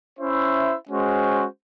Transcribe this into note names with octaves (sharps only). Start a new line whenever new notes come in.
C#4 E4 C5 E5
G#3 C#4 F#4 C5